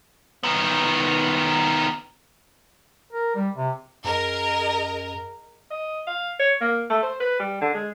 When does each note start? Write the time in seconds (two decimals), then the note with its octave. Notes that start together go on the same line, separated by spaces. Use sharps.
0.43 D#3 B3
3.13 A#4
3.35 G3
3.57 C3
4.05 F#2 G#4 A#4 D#5
5.71 D#5
6.07 F5
6.39 C#5
6.61 A#3
6.90 A3
7.03 C5
7.20 B4
7.40 G3
7.61 D3
7.74 G#3